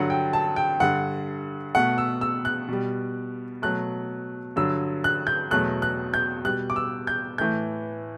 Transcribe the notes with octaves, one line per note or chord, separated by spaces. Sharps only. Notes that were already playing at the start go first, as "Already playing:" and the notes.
Already playing: G2 D3 F#3 F#5
G5
A5
G5
G2 D3 G3 F#5
B2 A3 F#5
E6
E6
F#6
B2 G3
B2 F#3 A3 F#6
G2 D3 F#3 E6
F#6
G6
E2 B2 F#3 A3 F#6
F#6
G6
B2 G3 F#6
D6
E6
G6
A2 E3 A3 G6